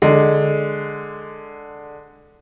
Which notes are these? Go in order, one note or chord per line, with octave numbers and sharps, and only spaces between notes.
D3 G#3